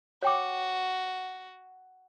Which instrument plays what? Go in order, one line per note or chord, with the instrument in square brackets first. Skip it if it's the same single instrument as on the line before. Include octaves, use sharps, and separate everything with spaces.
[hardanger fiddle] F#4 [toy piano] C#5 G5 D6